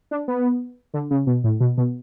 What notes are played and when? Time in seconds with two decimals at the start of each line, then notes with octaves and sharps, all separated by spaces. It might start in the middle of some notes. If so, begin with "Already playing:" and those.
0.11 D4
0.28 B3
0.94 D3
1.11 C#3
1.27 B2
1.44 A2
1.60 B2
1.77 B2